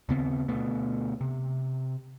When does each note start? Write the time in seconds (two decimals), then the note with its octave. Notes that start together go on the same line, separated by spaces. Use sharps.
0.09 D#2 C#3 B3 C4
0.48 D2 B2 A3 B3
1.21 C3